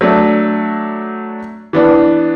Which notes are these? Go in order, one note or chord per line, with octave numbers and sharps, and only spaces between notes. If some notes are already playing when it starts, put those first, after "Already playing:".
F#3 A3 D4
E3 B3 D4